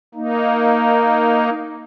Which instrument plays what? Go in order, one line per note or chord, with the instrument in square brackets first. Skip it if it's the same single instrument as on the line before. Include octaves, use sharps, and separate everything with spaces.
[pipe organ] A#3 D#4